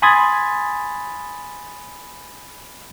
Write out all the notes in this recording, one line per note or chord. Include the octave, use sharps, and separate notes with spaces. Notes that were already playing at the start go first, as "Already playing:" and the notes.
G#5 B5 C6 D#6 G#6 A6